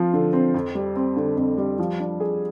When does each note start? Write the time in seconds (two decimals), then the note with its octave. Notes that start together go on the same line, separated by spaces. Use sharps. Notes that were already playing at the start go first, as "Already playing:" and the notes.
Already playing: F3 C4 F4
0.14 D3
0.33 C4
0.54 F2
0.75 G3
0.96 C4
1.17 D3
1.37 F2
1.57 G3
1.79 F3
2.00 D4
2.20 G#4